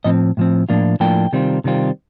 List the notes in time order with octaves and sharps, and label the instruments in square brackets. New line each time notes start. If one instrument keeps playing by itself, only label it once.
[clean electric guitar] A2 F3 C4 D#5
A2 F3 C4
A2 F3 A#3 D4 F4
A2 F3 A#3 D4 F4 G5
C3 D#3 G3 C4 F4
C3 D#3 G3 C4 F4